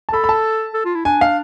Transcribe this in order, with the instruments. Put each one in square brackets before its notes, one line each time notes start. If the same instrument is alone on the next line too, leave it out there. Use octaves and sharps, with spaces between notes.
[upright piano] A5
[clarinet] A4 [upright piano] B5
[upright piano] B5
A5
[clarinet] A4
F4
E4
[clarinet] D4 [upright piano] G#5
[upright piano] F5